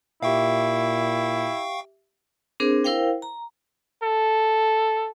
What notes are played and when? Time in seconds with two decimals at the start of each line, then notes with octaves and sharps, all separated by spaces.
0.23 A#2 E4 G4 E5 F5 G5 C#6
2.60 C4 D4 G#4 A#4 C5
2.84 E4 A#4 C5 F5 G5
3.22 A#5
4.03 A4